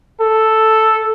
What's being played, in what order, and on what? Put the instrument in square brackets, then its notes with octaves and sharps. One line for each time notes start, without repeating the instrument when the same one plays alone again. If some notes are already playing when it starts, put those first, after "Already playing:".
[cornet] A4